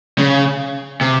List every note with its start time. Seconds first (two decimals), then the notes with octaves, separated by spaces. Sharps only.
0.18 C#3
1.01 C3